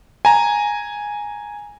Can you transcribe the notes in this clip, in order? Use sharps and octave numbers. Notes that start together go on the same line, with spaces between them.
G#5 A#5